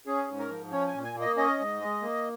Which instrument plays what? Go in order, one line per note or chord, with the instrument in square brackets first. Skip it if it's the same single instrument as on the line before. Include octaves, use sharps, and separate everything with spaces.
[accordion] C#4 G#4
G#2
A#4
F3
C#4 C#5
G#5
A#2
G#5
A#3
D#5
C#4 D#5
G#2
G#3
A#3